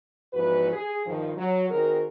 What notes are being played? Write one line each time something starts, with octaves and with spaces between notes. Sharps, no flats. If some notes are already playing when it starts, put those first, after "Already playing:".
E2 G#2 F3 F#4 B4
G#4
G2 D#3 F3
F#3
D#3 C4 F#4 G#4 A#4